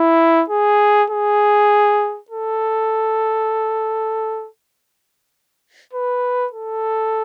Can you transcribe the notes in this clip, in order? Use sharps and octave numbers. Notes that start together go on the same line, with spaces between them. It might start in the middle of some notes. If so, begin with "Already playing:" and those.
Already playing: E4
G#4
G#4
A4
B4
A4